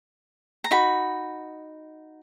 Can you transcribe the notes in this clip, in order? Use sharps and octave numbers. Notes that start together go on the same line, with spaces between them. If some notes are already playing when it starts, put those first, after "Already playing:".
A#5
D#4 F#4 B5